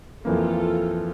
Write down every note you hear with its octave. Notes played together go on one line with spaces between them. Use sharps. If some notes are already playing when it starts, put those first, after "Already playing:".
F2 E3 A#3 F4 A4